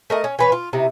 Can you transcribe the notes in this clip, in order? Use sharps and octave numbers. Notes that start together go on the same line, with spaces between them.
A3 A#4 D#5 A5
C#4
E3 B4 C#5
F4
C3 D#4 E4